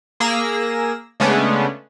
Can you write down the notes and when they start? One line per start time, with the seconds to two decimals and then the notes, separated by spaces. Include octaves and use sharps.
0.20 A#3 G#4 E6 A#6
1.20 C#3 G#3 A3 B3 C#4 D4